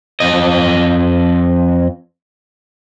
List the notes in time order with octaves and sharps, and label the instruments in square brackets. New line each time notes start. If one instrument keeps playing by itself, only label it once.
[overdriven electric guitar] F2 D#5